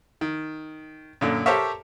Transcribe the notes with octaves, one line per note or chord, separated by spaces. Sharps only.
D#3
F#2 A#2 D3
G4 A4 A#4 C5 C#5 E5